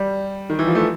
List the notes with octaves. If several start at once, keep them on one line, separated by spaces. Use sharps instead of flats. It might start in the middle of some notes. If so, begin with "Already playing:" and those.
Already playing: G3
D#3
E3
F3
A3